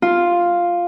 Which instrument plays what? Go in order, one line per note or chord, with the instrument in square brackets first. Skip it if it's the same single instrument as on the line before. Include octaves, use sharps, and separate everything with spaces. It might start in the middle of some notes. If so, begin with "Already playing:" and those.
[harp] F4